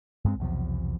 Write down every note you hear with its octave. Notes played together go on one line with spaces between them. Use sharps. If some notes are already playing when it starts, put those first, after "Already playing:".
G2 G#3 C4
B1 E2 C3 F3